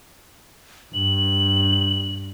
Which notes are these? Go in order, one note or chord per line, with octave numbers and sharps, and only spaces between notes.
G2 F#7